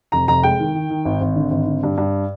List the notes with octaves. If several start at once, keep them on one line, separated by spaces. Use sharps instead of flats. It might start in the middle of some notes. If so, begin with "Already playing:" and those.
F1 A#5
F1 A#5
G#3 G5
D#3
D#3
D#3
G#1
G#1
D3
G#1
D3
G2
G2